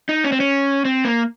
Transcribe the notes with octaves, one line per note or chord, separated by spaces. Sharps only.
D#4
C#4
C4
C#4
C4
A#3